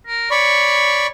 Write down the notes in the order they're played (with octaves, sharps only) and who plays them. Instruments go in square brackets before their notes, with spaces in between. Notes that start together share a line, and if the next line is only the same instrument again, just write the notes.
[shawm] A#4
[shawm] C#5 [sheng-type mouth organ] D5 B5 C#6